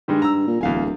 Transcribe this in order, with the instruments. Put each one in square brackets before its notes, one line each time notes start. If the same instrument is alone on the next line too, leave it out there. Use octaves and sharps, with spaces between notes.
[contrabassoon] G2 [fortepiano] D#3 G3 G#3
[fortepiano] A#5 E6
[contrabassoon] A#2
[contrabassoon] D1 [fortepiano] E2 F5 G#5